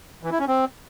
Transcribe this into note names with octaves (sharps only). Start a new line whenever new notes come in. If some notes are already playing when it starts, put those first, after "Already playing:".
E3
E4
C#4
C4